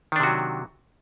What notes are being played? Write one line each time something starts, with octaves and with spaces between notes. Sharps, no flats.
C3 D#3 F#3 D4 F#4